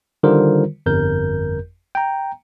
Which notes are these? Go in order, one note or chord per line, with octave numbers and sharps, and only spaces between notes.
D3 D#3 G3 F4 A#4 C5
G1 F2 A#4 G6
G5 A#5